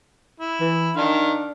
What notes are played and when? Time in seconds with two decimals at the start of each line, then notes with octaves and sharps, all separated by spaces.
0.40 E4
0.60 E3
0.97 D#3 D4 F5 F6